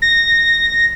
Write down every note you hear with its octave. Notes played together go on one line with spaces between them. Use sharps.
A#6